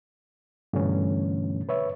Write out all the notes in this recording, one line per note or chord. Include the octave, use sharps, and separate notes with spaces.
G2 B2 D3 E3 A3 C#4
B4 C#5 E5